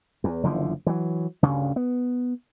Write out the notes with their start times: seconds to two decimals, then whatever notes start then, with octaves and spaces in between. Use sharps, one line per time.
0.24 E2
0.43 F#1 D3 E3 F3
0.86 E3 F#3
1.43 D2 G2 C#3
1.76 B3